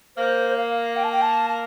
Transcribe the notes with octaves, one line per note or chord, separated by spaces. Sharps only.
A#3 C5
F5
G5
A5
G5
A5
A5